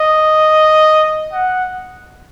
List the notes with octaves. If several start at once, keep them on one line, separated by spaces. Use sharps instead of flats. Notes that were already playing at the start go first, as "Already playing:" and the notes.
Already playing: D#5
F#5